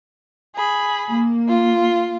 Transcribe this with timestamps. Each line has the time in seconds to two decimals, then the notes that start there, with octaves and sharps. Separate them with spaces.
0.56 G#4 B5
1.09 A#3
1.49 F4